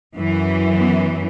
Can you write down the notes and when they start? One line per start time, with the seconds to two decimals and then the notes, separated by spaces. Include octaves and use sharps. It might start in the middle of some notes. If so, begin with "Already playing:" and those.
0.16 F#2 E3
0.78 B3